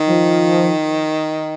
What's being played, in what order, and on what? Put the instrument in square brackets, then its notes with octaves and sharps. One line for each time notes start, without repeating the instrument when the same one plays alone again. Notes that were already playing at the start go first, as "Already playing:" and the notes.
Already playing: [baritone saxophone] D#3
[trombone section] F3